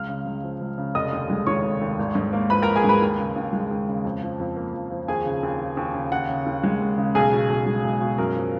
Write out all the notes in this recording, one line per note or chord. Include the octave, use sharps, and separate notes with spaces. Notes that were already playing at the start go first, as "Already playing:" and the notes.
Already playing: C#2 F5 F6
C#3
C#2
F3
C#2
C#3
F1 D#5 D#6
D#2
G#3
D#3 C#5 C#6
F1
D#2
G#1
G#2
A#3
F3 B4 B5
G#1 A#4 A#5
G#4 G#5
G#2 B4 B5
D#2
C#3
D#2
G#3
D#2
C#3
F2
F3
F2
A#3
F2
F3
D#2 G#4 G#5
C#3
D#2
F3
D#2
C#3
D#2 F#5
C#3
D#2
G#3
D#2
C#3
B1 G#4 G#5
B2
B1
G#3
B1
B2
F#2 A#4 A#5
F3